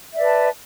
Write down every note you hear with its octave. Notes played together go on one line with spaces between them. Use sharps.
B4 D5 E5 A5